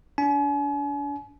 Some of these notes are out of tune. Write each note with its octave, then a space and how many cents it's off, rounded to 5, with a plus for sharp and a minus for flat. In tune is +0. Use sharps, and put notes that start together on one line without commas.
D4 -35 G#5 +40